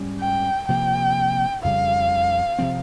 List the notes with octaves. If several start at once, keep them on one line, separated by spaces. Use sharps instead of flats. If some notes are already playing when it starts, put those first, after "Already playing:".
Already playing: G#2 G3 C#4
G5
C3 F3 A#3 G5
F2 C#3 G3 F5
C3 F3 C4